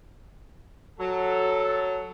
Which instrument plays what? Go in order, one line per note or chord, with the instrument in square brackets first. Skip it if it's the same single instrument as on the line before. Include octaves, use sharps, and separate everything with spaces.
[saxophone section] F#3 [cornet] A4